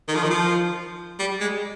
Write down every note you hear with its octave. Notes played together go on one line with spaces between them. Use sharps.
D#3
F3
D#3
F3
G3
G#3